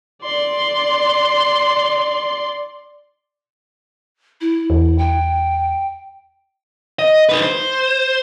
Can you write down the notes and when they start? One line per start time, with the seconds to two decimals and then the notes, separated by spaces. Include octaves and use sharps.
0.23 D5 C6
4.41 E4
4.70 E2
4.98 G5
6.99 D#5
7.29 D#4 B4
7.42 C5